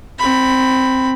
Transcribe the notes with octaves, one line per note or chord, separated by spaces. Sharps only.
C4 B5